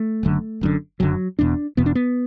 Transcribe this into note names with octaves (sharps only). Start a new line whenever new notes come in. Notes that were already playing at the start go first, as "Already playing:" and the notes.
Already playing: A3
F#1 F#2 D3
F#1 F#2 D3
F#1 F#2 D3 F#3
E1 E2 B2 D4
E1 E2 B2 B3
D4
B3